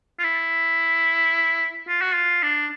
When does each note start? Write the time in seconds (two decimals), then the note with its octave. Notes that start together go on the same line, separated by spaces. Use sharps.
0.19 F4
0.24 E4
1.88 F4
2.01 F#4
2.15 F4
2.43 D4